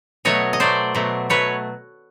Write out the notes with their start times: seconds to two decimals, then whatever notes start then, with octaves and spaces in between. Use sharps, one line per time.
0.25 B2 F#3 A3 C#5 D#5
0.53 D#5
0.60 B2 F#3 A3 C5 D5
0.95 B2 F#3 A3
1.30 B2 F#3 A3 B4 C#5